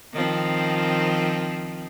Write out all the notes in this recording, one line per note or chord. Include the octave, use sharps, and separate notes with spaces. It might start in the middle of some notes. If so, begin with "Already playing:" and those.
D#3 F3 C4